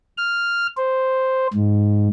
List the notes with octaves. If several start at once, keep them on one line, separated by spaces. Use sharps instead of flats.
F6
C5
G#2